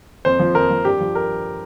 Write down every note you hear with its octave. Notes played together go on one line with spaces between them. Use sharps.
F2 C5
F3
F2 A#4
F3
G2 G4
F3
A#4